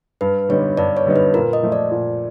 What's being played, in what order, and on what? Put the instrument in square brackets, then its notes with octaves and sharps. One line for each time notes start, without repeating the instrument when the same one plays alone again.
[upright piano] G2 [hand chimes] B4
[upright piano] D3 G3 B3 D#4 [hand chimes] C#5
[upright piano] G2 [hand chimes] D5
[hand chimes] C#5
[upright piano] D3 G3 B3 D#4
[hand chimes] B4
[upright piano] A#2 [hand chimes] A#4
[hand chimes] D#5
[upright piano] F3 A3
[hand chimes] D5
[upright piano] A#2